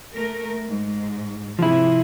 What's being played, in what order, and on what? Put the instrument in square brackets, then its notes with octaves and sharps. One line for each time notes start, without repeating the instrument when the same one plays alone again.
[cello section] A3 A#4
G#2
[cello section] C3 G#4 [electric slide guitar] F3 E4